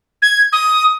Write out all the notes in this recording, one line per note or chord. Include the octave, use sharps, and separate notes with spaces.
G#6
D#6